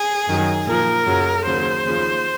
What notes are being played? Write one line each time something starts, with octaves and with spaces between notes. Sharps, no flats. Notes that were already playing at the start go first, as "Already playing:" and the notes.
Already playing: G#4
F#2 D#3 F#3
A#2 F3 A#4
F#2 C#3 F#3
D#2 C#3 F#3 C5
D#2 C#3 F3